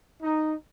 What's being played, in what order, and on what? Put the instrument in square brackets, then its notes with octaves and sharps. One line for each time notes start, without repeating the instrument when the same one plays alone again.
[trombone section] D#4